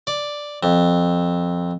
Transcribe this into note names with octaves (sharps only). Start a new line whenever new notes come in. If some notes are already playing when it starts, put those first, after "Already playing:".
D5
F2